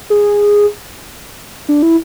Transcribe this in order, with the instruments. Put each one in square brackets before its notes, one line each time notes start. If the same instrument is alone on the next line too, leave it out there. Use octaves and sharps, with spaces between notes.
[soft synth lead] G#4
D4
E4